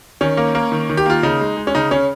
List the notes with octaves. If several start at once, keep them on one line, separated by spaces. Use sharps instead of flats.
D#3 C#4
A#3
A#3
D#3
D#3
G4
A#3 F4
C#3 D#4
G#3
G#3
C#4
C#3 D#4
C#3 C#4